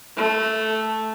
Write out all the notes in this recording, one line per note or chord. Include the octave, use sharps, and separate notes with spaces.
A3